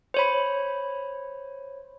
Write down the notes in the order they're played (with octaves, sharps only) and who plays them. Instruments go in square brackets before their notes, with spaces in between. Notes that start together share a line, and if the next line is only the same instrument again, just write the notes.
[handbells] C5 C#5 B5